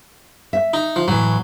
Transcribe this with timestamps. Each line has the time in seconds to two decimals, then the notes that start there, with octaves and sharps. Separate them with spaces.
0.53 E5
0.74 D#4
0.96 F3
1.08 A2 E3 F#3